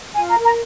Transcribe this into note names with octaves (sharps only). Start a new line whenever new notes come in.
F4 G#5
A#5
A#4
A#5